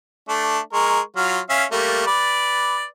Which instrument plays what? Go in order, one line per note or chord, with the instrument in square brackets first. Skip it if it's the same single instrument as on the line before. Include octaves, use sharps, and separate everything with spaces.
[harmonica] A3 D4
G#3 A#4 C#6
F#3 F4 F6
C#4 E5 F5
G3 A3 A#3
B4 D5